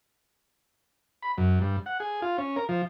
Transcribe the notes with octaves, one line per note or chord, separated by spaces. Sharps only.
B5
F#2
G2
F#5
G#4
F4
C#4
A#4
F3